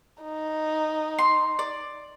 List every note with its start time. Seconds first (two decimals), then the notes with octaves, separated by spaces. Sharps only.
0.23 D#4
1.19 C6
1.59 D5